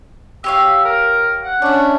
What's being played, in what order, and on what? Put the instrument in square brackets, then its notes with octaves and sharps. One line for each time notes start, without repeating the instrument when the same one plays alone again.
[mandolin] G4 C#5 F5 [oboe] E6
[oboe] A#4
F#5
[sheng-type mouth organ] C#4 D4 [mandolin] D5 E5